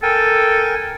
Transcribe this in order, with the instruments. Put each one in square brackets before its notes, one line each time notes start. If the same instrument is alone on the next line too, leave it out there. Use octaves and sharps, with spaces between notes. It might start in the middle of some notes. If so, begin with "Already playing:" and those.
[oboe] A4 [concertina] A#4 G5 G#5